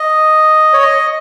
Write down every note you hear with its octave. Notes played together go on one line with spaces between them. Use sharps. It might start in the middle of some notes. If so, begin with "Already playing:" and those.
Already playing: D#5
C#5
D#5